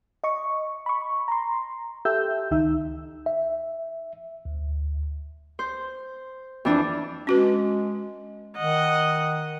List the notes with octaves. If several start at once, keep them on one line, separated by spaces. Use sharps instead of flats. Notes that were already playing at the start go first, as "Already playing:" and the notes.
D#5 C#6
B5 C#6
A#5 C6
G4 A4 E5 E6 G6
C#2 D#3 D#4 E5 E6
E5
D2
C5
F2 E3 D4
G#3 C#4 F#4 B4
D#3 D#5 F#5